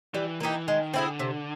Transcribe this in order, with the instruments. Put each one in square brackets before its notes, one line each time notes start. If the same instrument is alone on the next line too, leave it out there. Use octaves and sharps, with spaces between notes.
[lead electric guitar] E3 [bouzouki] G3
[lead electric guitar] E3 [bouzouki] A#3 D#4 G4
[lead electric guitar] D#3 [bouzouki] G#3
[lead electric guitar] D3 [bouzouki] C4 E4 G#4
[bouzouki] C3